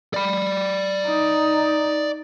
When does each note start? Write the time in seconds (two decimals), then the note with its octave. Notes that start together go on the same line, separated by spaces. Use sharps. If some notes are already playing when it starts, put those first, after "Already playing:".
0.14 D5 B5
1.07 D#4